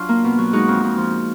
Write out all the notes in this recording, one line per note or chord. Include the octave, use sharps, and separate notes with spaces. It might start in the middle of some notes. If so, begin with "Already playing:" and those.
Already playing: F#3 D4 F4
A#3
B2
F#3
G#3 D#4 F#4
F2
F2
F3